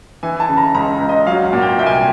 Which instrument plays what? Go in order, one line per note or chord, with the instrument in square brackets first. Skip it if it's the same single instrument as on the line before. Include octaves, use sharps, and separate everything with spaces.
[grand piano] E3 G#5
A5
C#3
A#5
C#2 A#5
C#2
D#5
F#3 F5
F#5
A#2
G5
C2 G5
G#5
G5